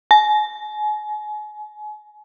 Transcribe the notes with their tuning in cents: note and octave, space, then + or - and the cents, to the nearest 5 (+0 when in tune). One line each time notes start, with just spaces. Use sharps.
G#5 +35